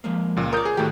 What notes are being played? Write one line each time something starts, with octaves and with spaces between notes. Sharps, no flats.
F3 G#3 A#3
C#2 A#2
A#4 C#5 D5 D#6 G6
G#4
A2 D#3 A3 F#4 G4